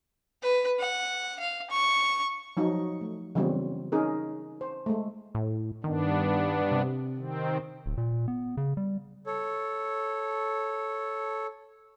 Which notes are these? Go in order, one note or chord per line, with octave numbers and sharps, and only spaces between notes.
B4
F#5
F5
C#6
F3 F#3 D#4
A3
C#3 E3 F#3 G3 B3 C4
C#4 D#4 G#4 A#4
C5
G#3 A3
A2
G2 D#3 B3 D4
C3
D#3 C4
D1
A#2
B3
C#3
G3
A4 C#5